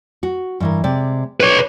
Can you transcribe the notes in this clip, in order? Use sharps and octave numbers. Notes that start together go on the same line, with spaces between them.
F#4
G2 E3 A#4
C3 G#3 D5
D4 B4 C#5